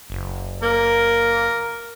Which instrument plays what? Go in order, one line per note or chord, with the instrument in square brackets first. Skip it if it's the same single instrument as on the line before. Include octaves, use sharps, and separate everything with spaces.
[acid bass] F#1
[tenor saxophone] A#3 [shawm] A#4